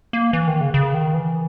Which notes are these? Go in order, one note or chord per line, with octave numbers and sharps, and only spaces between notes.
A#3
E3
D#3
C#3
C#3
D#3
E3